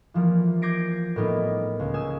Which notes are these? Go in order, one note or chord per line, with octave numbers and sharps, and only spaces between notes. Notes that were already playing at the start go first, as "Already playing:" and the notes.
E3 F3 G3 A#3
D6 G6 G#6 A#6 C7 D7
A2 G3 A#3 B3 D#4
C#2
G#5 D#6 E6